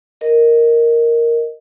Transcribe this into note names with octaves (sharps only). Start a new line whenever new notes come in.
A#4 D#5